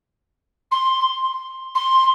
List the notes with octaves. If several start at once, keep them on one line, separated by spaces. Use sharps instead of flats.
C6
C6